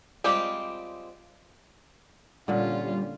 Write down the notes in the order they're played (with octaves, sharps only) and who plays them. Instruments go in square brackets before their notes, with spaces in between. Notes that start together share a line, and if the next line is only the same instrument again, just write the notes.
[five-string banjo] G3 G#3 C4 F4 G4
[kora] A#2 D3 [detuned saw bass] G3 [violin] C#4 F4